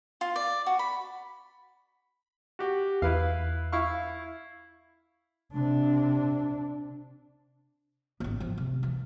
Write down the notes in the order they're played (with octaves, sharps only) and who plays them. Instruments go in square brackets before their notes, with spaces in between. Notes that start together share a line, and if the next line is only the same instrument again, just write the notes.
[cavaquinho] F4
D5
F#4
B5
[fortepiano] F#4 G4
[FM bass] E2 [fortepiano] E4 B4 F5
[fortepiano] E4 F5 C#6
[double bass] C3 D4
[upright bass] A1 B3
F3
C3
E3